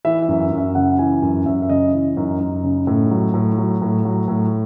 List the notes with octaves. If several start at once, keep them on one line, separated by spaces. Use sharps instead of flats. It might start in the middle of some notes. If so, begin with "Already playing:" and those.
E3 E5
E5
F#2
E5
F#2
E5
C#3 F#5
E3 G#5
F#2 G#5
F#2 E5
E5
C#3 D#5
E3
F#2 D#4
F#2
C#3
A2
F#3
A2
F#3
A2
F#3
A2